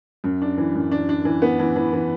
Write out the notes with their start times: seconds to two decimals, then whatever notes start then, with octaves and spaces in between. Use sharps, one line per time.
0.24 F#2
0.42 D4
0.58 E3
0.75 F#2
0.91 D4
1.09 D4
1.25 E3
1.42 B3
1.59 E3
1.76 E3
1.93 E3